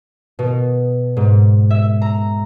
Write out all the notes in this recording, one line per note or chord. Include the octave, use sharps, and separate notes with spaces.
B2
G#2
E5
A#5